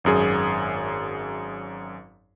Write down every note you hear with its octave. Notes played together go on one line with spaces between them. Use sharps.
G#1 F#2 G#4